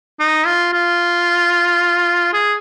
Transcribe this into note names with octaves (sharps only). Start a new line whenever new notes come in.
D#4
F4
F4
G#4